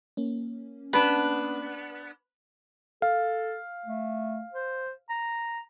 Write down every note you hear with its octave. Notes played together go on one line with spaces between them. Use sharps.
A#3 C#4
B3 D4 B4
A4 F5
A3
C5
A#5